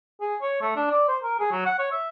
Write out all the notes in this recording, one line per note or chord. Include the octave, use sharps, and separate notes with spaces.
G#4
C#5
A3
D4
D5
C5
A#4
G#4
F#3
F#5
C#5
E5